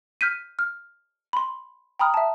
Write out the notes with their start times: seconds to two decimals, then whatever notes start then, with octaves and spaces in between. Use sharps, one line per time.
0.21 F6 G6 B6 D#7
0.59 F6
1.33 B5 C6
1.99 G5 A#5 B5 D#6 F6
2.14 E5 A5